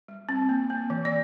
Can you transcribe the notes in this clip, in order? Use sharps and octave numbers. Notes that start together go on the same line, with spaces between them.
G3
C4
A#3
A#3
E3
D5